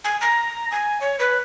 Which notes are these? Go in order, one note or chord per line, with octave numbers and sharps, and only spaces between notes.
G#5
A#5
G#5
C#5
B4